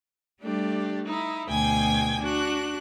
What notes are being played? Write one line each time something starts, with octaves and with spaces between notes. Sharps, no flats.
G3 A3 D4 G4
D#4 E4
D2 B2 G5 G#5 G#6
D4 F#4 F#6